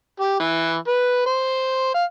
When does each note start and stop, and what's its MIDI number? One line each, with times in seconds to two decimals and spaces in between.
0.20 0.39 67
0.40 0.76 52
0.88 1.25 71
1.26 1.95 72
1.95 2.04 77